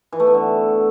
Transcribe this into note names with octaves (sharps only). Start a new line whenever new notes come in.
E3
A3
B3
D3